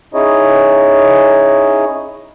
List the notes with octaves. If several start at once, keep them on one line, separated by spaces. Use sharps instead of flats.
C#4 D#4 E4 G#4 C#5 D#5